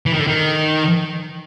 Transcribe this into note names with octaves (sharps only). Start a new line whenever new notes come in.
E3
D#3
D3
D#3